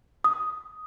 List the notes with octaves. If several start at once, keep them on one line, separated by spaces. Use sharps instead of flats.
D#6